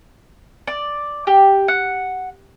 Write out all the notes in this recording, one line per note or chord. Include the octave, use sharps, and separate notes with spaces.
D5
G4
F#5